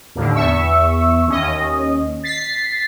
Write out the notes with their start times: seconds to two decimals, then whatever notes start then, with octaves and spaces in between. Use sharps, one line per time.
0.15 D#2 A2 D3
0.34 E2 E5 C#6 E6
1.27 D#2 C#4 D#5
2.24 A6 B6 C7